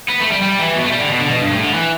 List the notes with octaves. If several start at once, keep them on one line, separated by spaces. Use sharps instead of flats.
B3
A3
G3
G3
E3
B2
A3
G3
D3
B2
D3
B2
G2
A2
D3
E3